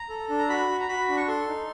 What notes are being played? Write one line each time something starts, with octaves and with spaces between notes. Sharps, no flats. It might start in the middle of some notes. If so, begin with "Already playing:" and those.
Already playing: A#5
A4
D4
A#5
F#4 B5
F#4
A#5
F#4 B5
D4
C#6
A4 C6
D#4